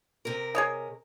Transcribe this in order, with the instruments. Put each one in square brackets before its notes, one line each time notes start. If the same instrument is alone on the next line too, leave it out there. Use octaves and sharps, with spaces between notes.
[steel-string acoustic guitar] C3 A#4
[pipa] G#4 C#5 D#5